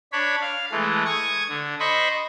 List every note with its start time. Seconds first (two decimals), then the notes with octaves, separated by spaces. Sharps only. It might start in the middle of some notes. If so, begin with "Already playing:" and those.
0.12 D4 C#5 B5
0.42 F5
0.72 E3 G#3 A3
1.06 C#6 D#6 G#6
1.49 D3
1.80 C5 D#5 B5 C#6